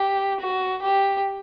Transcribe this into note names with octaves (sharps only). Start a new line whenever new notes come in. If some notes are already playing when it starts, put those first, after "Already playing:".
Already playing: G4
F#4
G4